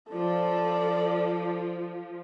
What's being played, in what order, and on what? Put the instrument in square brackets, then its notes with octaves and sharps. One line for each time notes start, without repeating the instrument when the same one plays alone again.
[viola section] F3 [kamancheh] A4 D5